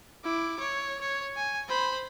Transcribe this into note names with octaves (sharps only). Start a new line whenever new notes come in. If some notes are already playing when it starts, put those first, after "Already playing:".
E4 D6
C#5
C#5
G#5
C5 B5